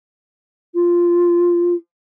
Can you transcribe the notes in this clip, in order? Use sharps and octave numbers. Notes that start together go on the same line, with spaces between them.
F4